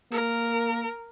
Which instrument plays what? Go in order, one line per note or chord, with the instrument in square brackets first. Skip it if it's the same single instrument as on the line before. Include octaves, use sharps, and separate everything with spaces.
[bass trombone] A#3 [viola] A#4